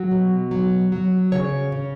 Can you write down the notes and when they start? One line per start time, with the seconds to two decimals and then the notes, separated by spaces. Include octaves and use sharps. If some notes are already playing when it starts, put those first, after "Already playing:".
Already playing: F#3 F#4
0.11 B2
0.51 F#3
0.92 F#3
1.32 C#3 C#5
1.72 C#3